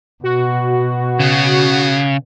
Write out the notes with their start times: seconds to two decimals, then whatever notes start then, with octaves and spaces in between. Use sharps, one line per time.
0.24 B2 F#4
1.19 C#3 B3 D4 G#4